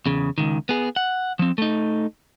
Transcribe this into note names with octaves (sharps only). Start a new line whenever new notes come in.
E2 C#3
C#2 D#3
B3 G#4
F#5
F3 C4
A3 D#4